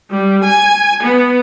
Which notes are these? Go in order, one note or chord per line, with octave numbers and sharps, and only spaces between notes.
G3
G#5
B3